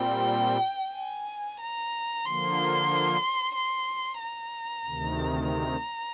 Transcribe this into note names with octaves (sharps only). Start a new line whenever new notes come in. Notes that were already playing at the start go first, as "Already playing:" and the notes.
Already playing: A#2 G3 C4 G5
G#5
A#5
D3 F3 A#3 C6
C6
A#5
D2 C3 D#3
A#5